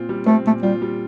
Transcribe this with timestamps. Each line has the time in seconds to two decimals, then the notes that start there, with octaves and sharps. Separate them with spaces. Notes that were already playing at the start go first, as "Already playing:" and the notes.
Already playing: A#2 C4 F4
0.09 G3
0.26 A3 C4
0.45 A#2 A3
0.62 G3 F4
0.82 G3